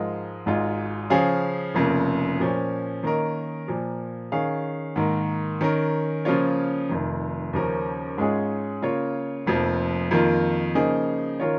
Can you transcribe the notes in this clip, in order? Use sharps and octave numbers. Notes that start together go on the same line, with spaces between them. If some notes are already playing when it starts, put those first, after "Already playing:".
Already playing: G#2 F3 G#3 F4 A#4
G#1 G#2 G#3 F4
C#3 F3 C#4 G#4 F5
F1 F2 C#3 A#3
A#2 F3 C#4
D#3 A#3 C#4 A#4 D#5
A#2 F3 A#3
D#3 C#4 G#4 F5
G#2 D#3 A#3
D#3 C#4 A#4
C#3 F3 A#3 F4 C#5
F1 F2 D#3
D#2 C#3 F3 C#4 A#4
G#2 G#3 C#4 F4 G#4
C#3 A#3 F4 C#5
F1 F2 F3 A#3
F2 D#3 A#3 F4
C#3 F3 A#3 D#4 G#4
D#3 C#4 F4 A#4 C#5